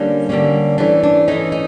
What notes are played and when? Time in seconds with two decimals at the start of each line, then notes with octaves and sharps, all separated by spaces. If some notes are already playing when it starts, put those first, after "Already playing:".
Already playing: D3 G3 A#3 C#4 D4
0.29 D3 G3 A#3 C#4
0.78 E3 A3 C#4 D4
1.03 D4
1.28 E3 A3 C#4 D#4
1.52 D#4